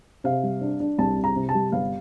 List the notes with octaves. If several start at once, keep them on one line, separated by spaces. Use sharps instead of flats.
C3 F5
G3
D4
D4
C2 A5
C3
A#5
C3
A5
G3
G1 F5